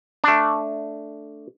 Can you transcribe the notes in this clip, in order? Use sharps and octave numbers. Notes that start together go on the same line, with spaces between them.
A3 D4